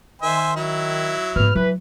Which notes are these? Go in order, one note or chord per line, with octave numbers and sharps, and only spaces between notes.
D#3 C5 E5 G#5
F#3 E4
G#2 B3 B4 F6
E3 F#3 B4